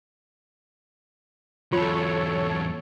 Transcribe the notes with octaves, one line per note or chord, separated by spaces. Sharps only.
E2 F#3 F4 A4 C#5 C6